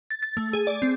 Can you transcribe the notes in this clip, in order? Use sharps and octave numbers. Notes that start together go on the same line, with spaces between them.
A6
A6
A3
G#4
D5
C4